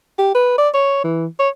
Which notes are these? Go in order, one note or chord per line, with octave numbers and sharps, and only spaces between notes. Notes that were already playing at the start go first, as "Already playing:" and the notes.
G4
B4
D5
C#5
E3
C#5